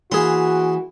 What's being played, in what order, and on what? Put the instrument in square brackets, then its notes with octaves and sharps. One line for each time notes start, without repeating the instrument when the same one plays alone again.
[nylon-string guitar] E3 A#3 [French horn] F#4 [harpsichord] G#4 C6